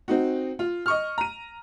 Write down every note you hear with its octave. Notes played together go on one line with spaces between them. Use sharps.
C4 D#4 F#4
F4
D#5 C#6 F6
A#5 D#7